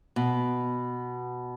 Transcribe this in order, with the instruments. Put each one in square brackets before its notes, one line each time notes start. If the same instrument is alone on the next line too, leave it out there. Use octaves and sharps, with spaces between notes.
[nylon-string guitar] B2